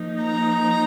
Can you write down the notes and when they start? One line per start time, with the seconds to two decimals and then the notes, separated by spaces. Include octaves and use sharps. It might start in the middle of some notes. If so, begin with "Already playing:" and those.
Already playing: F3 A#3 D#4
0.23 A#5